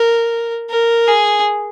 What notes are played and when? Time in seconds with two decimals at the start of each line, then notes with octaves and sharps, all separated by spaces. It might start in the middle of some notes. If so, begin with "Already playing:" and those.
Already playing: A#4
0.70 A#4
1.07 G#4